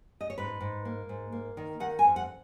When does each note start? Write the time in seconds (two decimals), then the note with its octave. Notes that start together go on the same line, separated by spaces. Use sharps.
0.21 D#5
0.30 C#5
0.38 G#2 B4
0.61 G#2
0.85 A#3
1.09 G#2
1.32 A#3
1.57 D#3
1.80 D#3 F#5
1.99 G#5
2.04 F2
2.16 F#5